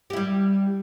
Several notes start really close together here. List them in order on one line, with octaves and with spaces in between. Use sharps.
G4 E4 G3